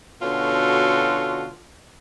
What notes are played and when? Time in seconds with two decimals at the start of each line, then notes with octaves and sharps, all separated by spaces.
0.22 B2 D3 C#4 F4 F#4 A4